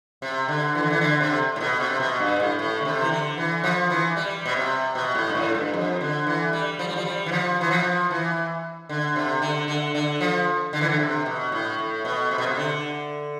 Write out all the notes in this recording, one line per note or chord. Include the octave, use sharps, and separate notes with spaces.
C3
D3
E3
D3
E3
D3
C3
A2
B2
C3
B2
G2
A2
A2
D3
C3
E3
D3
E3
F3
E3
G3
B2
C3
B2
A2
G2
A2
G2
F2
D3
E3
G3
F3
G3
F3
G3
E3
F3
E3
F3
E3
D3
C3
D3
D3
D3
F3
D3
E3
D3
C3
B2
A2
A2
B2
C3
B2
C3
D3